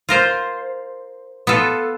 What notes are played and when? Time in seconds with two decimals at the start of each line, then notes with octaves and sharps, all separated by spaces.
0.09 F4 A#4 C5
1.47 B3 F4 A4